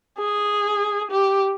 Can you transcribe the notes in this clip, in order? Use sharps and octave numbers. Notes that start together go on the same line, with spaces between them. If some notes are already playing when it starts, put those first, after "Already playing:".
G#4
G4